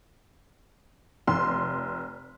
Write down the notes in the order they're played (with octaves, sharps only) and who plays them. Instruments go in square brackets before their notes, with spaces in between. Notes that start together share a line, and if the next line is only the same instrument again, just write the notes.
[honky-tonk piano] F1 C6